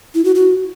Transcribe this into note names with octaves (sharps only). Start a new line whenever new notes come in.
E4
F#4
F#4